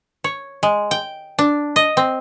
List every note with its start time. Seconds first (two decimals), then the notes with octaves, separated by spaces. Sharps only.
0.24 C#5
0.63 G#3
0.91 G5
1.39 D4
1.76 D#5
1.97 C4